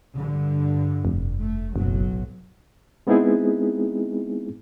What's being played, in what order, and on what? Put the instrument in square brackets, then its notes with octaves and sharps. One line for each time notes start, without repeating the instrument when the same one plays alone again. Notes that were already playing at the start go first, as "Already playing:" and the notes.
[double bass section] G2 D3
[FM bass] F1
[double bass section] A3
[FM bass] F#1 [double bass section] B1 A2 F#3
[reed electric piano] G#3 B3 C4 D#4 E4 G#4